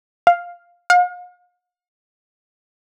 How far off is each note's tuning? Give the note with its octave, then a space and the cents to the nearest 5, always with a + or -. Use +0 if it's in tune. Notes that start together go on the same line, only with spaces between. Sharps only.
F5 +5
F5 +45